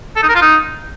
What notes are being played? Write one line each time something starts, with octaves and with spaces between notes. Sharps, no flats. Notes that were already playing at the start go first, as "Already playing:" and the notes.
A4
D#4
A#4
F4
D#4